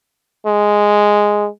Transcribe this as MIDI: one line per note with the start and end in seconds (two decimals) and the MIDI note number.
0.46 1.48 56